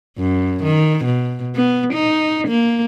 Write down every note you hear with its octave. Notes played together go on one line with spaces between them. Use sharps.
F#2
D#3
B2
B3
D#4
A#3